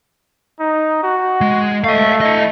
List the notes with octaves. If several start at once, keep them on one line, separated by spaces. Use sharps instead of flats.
D#4
F#4
G#3
A3 D#5 F5
E4 D#5